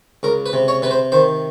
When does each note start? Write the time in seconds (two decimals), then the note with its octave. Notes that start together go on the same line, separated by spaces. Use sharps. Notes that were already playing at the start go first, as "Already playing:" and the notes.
0.23 C#2 A#4
0.46 B4
0.53 C3
0.68 C#5
0.82 C3 B4
0.91 C5
1.12 D#3 C5